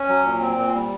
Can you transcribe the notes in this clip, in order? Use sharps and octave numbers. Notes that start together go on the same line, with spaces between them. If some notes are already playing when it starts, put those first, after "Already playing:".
Already playing: C#4
F#3
A#2
C4
A#2
G3